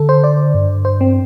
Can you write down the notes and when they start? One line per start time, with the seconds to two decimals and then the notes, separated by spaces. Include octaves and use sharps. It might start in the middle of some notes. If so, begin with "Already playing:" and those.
Already playing: D3 A4
0.09 C5
0.24 D5
0.55 G2
0.85 C5
1.01 C4